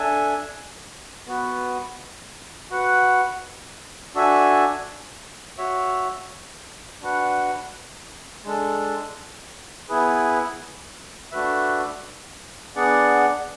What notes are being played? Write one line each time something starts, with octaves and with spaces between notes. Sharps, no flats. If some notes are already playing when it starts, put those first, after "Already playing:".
Already playing: D4 A4 E5 G#5
B3 F#4 B4
F#4 B4 F#5
D4 F#4 A4 E5 G#5
F#4 C#5 E5
D4 F#4 B4 F#5
G#3 D4 A4
B3 E4 G#4 B4
A3 D4 F#4 B4 E5
B3 D4 G#4 D5 F#5